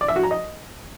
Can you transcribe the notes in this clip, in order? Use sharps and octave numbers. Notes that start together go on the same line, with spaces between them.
D5
E5
F#4
A#5
D#5